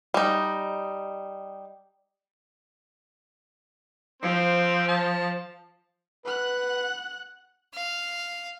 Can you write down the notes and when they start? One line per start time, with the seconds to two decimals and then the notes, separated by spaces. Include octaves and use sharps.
0.14 G3 D#4
4.22 F3 C4
4.88 A5
6.25 B4 F#5 F#6
7.73 F5